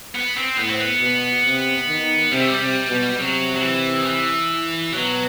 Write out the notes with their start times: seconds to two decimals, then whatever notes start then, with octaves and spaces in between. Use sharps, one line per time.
0.15 B3
0.36 C4
0.57 A2 B3
0.69 C4
0.80 B3
1.01 B2
1.45 C3
1.88 D#3
2.31 C3 G3
2.40 A3
2.48 G3
2.60 C3
2.89 B2
3.18 C3 F#3
3.56 F#3
3.62 E3
4.01 D#3
4.06 E3
4.92 B2 F#3